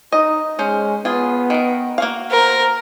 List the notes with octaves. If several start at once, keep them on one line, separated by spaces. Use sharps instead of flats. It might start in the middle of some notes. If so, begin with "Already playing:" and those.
D#4 D#5
G#3 C#4 C5
B3 F4 G#4
D#3 A#4
A#3 F#4 F5
A#4 C5